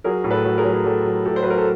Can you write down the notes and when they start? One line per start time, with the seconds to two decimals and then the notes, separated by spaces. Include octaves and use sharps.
0.04 F#3 G#4 A#4
0.24 A2
0.31 A4 B4
0.45 F#3
0.58 G#4 A#4
0.64 F#3
0.73 G#4
0.85 F#3 G4 A4
1.05 F#3
1.25 A2 G4 A4
1.36 C5
1.43 F#3 B4
1.50 A#4
1.58 A4